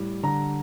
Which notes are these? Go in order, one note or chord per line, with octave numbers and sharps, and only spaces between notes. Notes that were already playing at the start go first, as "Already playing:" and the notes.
Already playing: A2 G3
D3 A#5